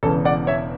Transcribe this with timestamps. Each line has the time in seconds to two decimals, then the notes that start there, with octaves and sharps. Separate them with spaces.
0.03 E1 E2 C#3 E3 A4
0.25 D5 F#5
0.47 C#5 E5